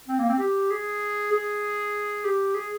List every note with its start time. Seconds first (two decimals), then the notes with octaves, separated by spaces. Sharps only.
0.08 C4
0.19 A#3
0.29 C4
0.39 G4
0.71 G#4
1.32 G#4
2.25 G4
2.55 G#4